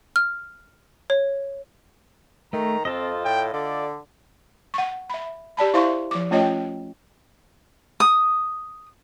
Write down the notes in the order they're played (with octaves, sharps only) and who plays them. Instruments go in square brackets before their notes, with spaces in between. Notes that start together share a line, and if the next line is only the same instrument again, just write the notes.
[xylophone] F6
C#5
[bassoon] D#3 [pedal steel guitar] A3 [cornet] A#5
[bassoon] F2 [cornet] C4 [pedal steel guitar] F4 A4 D#5
[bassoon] A2 [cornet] G5
[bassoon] D3 [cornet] D5
[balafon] F#5 C#6
E5 B5
G4 D5 A5 B5
E4 C5 E5 F5 C6 C#6
F3 D6
A3 C#4 F4 C#5 D#5 G5
[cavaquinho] D#6